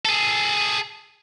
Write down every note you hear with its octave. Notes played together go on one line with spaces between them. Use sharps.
G#4 A4